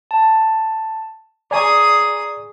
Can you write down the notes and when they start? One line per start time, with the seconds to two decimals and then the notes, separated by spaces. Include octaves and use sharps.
0.11 A5
1.51 G#4 D5 G#5 A#5 C#6 D#6